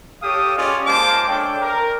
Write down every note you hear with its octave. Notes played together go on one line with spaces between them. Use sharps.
G4 A4 C#5 F5 D#6
C#4 F4 G4 G#4 D5 D#5
G#3 A#3 C5 F5 A5 D6
D4 A4 C#5 D5 G5
A#4